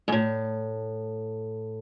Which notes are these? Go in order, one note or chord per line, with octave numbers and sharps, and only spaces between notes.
G#2
A2